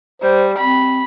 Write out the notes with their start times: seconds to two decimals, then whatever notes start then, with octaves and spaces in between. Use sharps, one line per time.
0.22 G3 C5
0.58 C4 B5